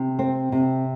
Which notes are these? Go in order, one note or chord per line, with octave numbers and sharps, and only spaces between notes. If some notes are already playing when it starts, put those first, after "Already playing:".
Already playing: C3
C4
C3